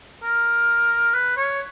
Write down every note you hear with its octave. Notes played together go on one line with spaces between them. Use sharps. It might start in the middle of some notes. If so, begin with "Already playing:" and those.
A#4
B4
C#5